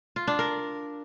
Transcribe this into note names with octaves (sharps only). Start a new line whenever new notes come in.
F4
D4
A#4